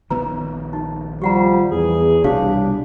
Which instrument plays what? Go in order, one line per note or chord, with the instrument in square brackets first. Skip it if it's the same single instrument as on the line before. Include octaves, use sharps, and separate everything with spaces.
[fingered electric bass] A#1 D#3 B3 [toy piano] B4 A#5
[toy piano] D#4
[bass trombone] F3 [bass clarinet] G3 [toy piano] G4 F#5 A#5
[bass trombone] E2 [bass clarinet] G#4
[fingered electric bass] C2 B2 [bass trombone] G3 [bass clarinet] D4 [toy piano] G4 C#5 F5